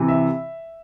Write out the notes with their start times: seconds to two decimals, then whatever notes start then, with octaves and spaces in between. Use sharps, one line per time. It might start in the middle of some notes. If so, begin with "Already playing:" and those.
Already playing: C3 E3
0.08 E5